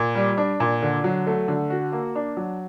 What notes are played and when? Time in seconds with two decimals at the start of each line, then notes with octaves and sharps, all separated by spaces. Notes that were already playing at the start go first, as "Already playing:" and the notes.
Already playing: A#2
0.15 G3
0.38 D4
0.60 A#2
0.82 D3
1.04 F#3
1.27 A3
1.48 D3
1.70 F#4
1.92 A#3
2.15 D4
2.37 F#3